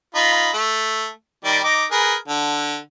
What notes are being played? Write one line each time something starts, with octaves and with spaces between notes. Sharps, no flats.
D#4 F4 B5
A3
D#3 G3 D5
D#4 D6
G#4 A#4 B4
D3